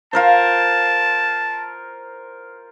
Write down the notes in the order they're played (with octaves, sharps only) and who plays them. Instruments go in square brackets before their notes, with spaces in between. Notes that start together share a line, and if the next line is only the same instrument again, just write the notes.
[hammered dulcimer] F4 A#4 C5 [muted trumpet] A5